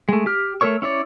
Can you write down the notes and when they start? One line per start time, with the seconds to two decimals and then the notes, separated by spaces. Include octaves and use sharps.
0.09 G#3 A3
0.26 G4 F6
0.61 A3 A4 A#4 C#5 C#6
0.82 C#4 E4 C#5 D5